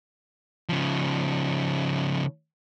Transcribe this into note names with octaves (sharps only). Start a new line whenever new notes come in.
C#3 F3